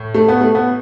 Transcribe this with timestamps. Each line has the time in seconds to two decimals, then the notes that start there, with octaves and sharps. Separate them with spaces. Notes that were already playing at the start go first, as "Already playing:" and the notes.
Already playing: A2
0.14 A3
0.28 B3
0.41 A3
0.55 B3